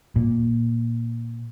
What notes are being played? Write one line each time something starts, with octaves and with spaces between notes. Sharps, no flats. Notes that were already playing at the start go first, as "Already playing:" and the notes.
A#2